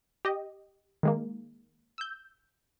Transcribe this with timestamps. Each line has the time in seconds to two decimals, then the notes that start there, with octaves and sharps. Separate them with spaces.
0.25 G4 D#5
1.03 D#3 G#3 A#3
1.98 E6 G6